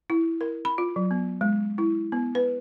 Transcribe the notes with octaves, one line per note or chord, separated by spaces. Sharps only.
E4
A#4
B5
F4
F#3
B3
G#3
E4
B3
B4